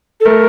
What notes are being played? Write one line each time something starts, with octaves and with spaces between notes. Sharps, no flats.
A4
A3 A#4